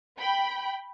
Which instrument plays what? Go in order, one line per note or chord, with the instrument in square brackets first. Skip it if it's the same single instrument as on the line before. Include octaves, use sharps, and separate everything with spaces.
[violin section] G5 B5